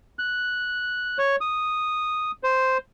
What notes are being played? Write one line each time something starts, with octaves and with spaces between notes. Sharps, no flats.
F#6
C#5
D#6
C5